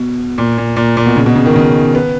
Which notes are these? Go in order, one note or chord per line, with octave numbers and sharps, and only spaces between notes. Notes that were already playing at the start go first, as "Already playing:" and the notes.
Already playing: B2
A#2
A#2
A#2
A#2
B2
C#3
B2
C#3
D#3
C#3
B3